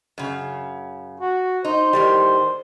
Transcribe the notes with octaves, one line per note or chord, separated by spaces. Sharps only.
F#2 C#3
F#4
D#4 C5
A2 D#3 G3